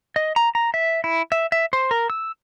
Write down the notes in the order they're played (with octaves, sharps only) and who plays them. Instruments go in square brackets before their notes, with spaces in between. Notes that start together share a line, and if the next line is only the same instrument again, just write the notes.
[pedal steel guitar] D#5
A#5
A#5
E5
E4
E5
E5
C5
A#4
E6